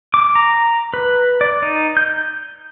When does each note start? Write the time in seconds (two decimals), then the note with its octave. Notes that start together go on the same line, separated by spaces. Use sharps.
0.14 D6
0.35 A#5
0.94 B4
1.41 D5
1.62 D#4
1.97 G6